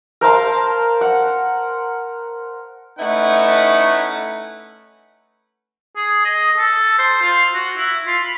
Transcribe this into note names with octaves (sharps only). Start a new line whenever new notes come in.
A#4 C5 F5 A5
F#5
A3 C#4 D#4 E4 B4 F#5
G#4
D#5
A4
C5
F4
F#4
E4
F4
B5